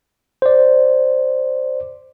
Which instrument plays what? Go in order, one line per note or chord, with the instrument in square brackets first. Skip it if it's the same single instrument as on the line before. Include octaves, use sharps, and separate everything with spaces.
[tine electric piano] C5 D5